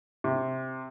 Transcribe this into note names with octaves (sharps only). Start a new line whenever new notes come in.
C3